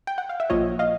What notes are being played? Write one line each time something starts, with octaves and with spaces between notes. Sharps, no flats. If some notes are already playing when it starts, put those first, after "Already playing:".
G5
F#5
F5
E5
A#1 A#2 F3 C#5 D#5
D#5 F5